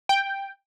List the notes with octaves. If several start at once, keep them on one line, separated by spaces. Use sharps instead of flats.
G5